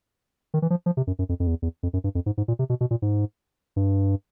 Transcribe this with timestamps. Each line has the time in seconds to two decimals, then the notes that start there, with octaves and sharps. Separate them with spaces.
0.54 D#3
0.62 E3
0.70 F3
0.86 F3
0.97 C3
1.07 F#2
1.19 F#2
1.29 F2
1.40 F2
1.47 E2
1.62 E2
1.83 F2
1.93 F#2
2.04 G2
2.15 F2
2.26 G#2
2.38 G#2
2.48 A#2
2.59 C3
2.70 B2
2.81 B2
2.91 A#2
3.02 G#2
3.76 G2